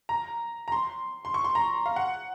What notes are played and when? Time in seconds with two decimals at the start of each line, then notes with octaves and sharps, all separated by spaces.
0.09 A#5
0.68 A#5
0.72 C6
1.25 C6
1.34 C#6
1.44 C6
1.55 A#5
1.86 F5
1.96 F#5